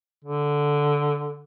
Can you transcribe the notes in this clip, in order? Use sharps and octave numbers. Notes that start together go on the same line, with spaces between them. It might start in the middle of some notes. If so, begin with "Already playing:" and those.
D3